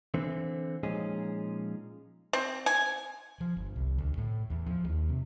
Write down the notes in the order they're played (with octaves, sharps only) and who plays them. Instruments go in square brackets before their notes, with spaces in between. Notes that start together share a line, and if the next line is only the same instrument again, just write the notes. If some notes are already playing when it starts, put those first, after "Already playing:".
[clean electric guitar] D3 E3 C4
A#2 F3 G#3 C#4 D#4 G#4
[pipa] C4
G#5
[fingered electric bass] F3
G1
C2
D2
A2
E2
F3
D#2
C3